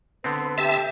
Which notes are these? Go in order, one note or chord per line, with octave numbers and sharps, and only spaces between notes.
D3 B3 C4 B4
B4
G4 E5 A5